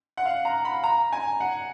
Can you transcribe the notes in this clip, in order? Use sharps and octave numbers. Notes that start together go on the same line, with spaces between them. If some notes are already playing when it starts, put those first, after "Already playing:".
F#5
F5
A#5
B5
A#5
G#5
F#5